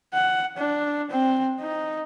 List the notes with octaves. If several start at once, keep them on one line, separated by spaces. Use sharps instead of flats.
F#5
D4
C4
D#4